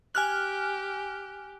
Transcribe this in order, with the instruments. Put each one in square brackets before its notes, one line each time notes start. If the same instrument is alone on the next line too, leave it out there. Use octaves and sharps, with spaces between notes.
[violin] G4 [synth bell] G#5 F6 F#6